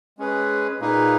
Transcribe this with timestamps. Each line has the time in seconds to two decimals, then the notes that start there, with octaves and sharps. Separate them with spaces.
0.18 G#3 C#4 G#4 B4
0.80 A#2 A#3 D#4 G#4 B4